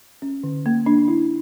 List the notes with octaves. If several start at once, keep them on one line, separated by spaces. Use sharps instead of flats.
C#4
D3
A#3
D4
E4